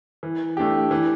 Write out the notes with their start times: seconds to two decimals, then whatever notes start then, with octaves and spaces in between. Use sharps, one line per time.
0.23 E3
0.57 A3 D4 G4
0.91 E3